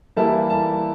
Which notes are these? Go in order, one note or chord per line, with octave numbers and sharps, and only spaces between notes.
E3 G3 A#3 E4 A5
A5